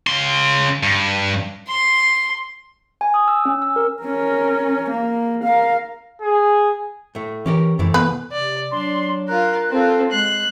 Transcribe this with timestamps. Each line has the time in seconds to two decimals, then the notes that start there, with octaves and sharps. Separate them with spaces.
0.07 C#3 C6
0.83 G2
1.67 C6
3.01 G#5
3.14 D#6
3.28 E6
3.45 C#4
3.62 E6
3.76 A#4
4.02 C#4 A#4
4.90 A#3
5.44 A#4 F5
6.22 G#4
7.15 A2 A3
7.46 E3 C#4 G4 A#4
7.79 C2 F#2 E3 A3
7.94 B3 B4
8.32 C3 D5
8.71 F#3 D4 C6
9.28 F4 A#4 F#6
9.71 C4 F4 A4
10.12 G#3 F#6 C7